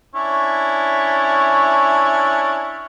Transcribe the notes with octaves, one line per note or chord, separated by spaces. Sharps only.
C#4 D4 E4